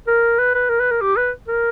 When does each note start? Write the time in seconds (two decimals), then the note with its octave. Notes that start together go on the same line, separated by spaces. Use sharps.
0.07 A#4
0.38 B4
0.54 B4
0.69 A#4
0.79 B4
0.91 A#4
1.01 G4
1.17 B4
1.48 A#4